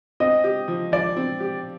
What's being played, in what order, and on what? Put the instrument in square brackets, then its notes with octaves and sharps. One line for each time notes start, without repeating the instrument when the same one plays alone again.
[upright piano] C4 [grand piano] D#5
[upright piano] G4
F3
[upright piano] F3 [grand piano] D5
[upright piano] C4
G4